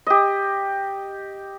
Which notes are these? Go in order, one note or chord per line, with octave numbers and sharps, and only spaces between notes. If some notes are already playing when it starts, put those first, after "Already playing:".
G4 D#5